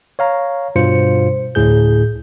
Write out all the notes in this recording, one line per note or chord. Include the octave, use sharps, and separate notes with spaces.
C#5 F5 A#5
G2 B2 F4 C5 C#7
D2 A2 G#4 G6